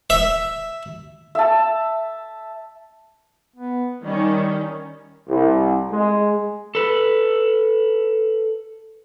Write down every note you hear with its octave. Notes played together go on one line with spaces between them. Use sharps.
E5
E5 A5
B3
D#3 G3 C#4
C2
G#3
A4 B4